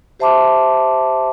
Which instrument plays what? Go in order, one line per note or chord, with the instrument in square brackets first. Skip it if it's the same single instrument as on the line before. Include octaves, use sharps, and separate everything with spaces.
[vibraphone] G4 C5 E5 A5 C6 D6